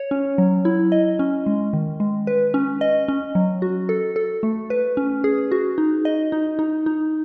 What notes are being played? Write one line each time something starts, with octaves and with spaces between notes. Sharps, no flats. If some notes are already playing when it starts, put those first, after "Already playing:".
Already playing: C#5
C#4
F#3
E4
D#5
C#4
G#3
D#3
G#3
B4
C#4
D#5
C#4
F#3
F#4
A4
A4
A3
B4
C#4
G#4
F#4
D#4
D#5
D#4
D#4
D#4